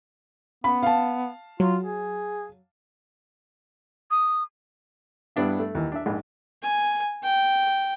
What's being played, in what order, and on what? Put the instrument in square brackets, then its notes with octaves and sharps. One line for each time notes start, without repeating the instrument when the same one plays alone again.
[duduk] B3 [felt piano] B5
[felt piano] F5 A5
[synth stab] F#3 [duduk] F4
[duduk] G#4
[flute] D#6
[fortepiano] G2 B3 D4 E4
A3
D#2 E3
D4 E5
A#1 G#2
[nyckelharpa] G#5
G5